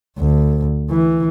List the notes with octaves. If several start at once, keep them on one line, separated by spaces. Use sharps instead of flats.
D2
E3